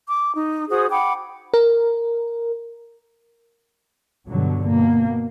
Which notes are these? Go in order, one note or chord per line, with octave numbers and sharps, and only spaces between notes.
D6
D#4
F#4 G#4 C5 D#6
F#5 G5 B5 D6
A#4
G2 B2 D3 F#3
B2 A#3